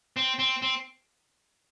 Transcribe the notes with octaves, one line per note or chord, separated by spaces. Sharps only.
C4
C4
C4